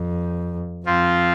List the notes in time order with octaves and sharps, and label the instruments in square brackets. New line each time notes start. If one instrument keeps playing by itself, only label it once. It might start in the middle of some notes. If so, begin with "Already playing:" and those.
Already playing: [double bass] F2
[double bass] F2 [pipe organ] F3 C4 F4